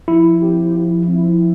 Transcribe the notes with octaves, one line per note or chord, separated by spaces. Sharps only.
F3 E4
C4 G4
F3
C4 E4